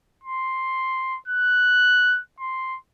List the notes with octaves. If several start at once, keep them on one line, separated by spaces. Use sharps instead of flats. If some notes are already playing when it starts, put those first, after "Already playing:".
C6
F#6
C6